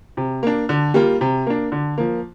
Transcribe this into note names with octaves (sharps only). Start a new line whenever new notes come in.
C3
A#3 D4
D3
G3 A#3 F4
C3
A#3 D4
D3
F3 A#3